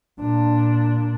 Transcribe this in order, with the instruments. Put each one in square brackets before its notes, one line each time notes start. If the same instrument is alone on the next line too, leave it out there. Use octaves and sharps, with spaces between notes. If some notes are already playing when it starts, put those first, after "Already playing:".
[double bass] A#2 D4